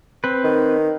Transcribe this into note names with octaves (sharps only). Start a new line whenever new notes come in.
C4 B4
D#3